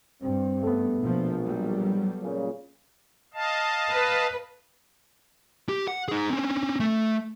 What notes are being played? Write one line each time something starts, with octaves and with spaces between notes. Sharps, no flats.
G2 C4
A3 B3
A#1 B2 F3
F#3 G3
A#2 C#3
D#5 F5 A5
B4
G4
F#5
D#4 G#4
C4 C#4
A3